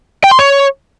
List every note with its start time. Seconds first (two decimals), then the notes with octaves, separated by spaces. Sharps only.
0.24 G5
0.31 C6
0.39 C#5